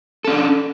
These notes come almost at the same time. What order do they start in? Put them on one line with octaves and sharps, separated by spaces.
A4 C#4 D4